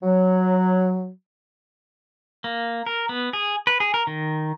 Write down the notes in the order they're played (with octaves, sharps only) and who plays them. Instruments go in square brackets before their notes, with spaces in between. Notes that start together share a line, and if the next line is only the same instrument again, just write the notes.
[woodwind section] F#3
[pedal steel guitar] A#3
A#4
B3
G#4
B4
G#4
A#4
D#3